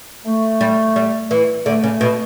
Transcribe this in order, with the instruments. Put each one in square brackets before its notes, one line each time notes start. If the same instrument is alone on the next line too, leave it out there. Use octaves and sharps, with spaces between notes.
[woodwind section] A3
[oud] G3
G3
E3
[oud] D3 [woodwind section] A3
[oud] C#3
B2